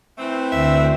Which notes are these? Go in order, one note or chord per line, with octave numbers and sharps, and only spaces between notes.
E3 A3 C4
D2 E5